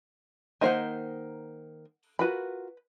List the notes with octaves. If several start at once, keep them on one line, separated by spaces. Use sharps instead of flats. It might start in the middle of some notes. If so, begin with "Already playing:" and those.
D#3 A#3 C5 D#5 F#5
F4 F#4 A#4 B4 B5